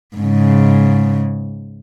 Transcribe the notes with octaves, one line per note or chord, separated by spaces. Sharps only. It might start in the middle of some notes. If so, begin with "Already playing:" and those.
G#2 C#3